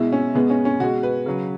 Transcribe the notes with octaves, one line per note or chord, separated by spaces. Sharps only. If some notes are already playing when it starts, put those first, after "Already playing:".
Already playing: B2 G#3 E4
C#4
B2 G#3 B3
C#4
C#4
B2 G#3 F#4
B4
C#3 F#3